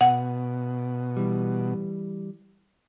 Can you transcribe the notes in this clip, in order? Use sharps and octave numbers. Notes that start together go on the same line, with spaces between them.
B2 F#5
E3 G3